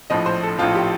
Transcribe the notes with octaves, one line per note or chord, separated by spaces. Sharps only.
A#1 A2 F3 D#5
C5
A4
A#1 A2 F3 F4
G4